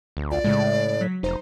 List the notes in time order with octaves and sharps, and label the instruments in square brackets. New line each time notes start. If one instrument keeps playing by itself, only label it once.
[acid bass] D2
[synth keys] B1 F4 [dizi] D5
[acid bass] A2 [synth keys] C#3 G#3
[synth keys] F#3 B6
[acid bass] F1 [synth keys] D#4 C5 A#5